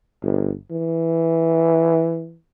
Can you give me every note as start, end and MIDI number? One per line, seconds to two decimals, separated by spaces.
0.23 0.52 31
0.71 2.36 52